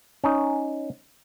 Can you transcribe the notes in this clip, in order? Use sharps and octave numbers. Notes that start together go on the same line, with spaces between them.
C#4 D#4